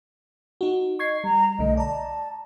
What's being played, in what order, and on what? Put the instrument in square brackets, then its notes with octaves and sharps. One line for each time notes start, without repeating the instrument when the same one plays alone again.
[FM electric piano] D#4 F#4
[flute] D#5 [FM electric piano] C#6 G#6 C7
[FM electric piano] G3 [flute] A#5
[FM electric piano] B1 D3 A3 [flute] D#5
[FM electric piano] D5 A#5 [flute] A5